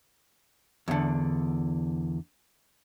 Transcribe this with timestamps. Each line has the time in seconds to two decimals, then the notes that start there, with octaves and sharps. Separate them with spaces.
0.88 E2 D3